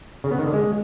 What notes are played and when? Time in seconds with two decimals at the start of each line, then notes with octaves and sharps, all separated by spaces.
0.24 C#3
0.31 B3
0.39 D#3
0.46 D3
0.54 G#3